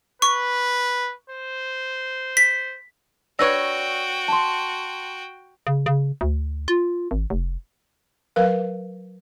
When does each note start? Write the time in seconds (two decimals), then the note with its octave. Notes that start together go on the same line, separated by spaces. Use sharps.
0.22 B4 C#6
1.30 C5
2.37 B6
3.39 D4 F#4 B4 C#5 D5 G5 E6 A#6
4.28 A5 C6
5.67 C#3
5.86 C#3
6.21 D2
6.68 F4
7.11 G#1
7.30 F1
8.36 F#3 A#4 B4 F5